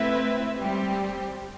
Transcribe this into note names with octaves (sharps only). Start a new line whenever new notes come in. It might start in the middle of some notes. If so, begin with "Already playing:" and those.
Already playing: A3 C4 E4 B4 E5
G3 C4 G4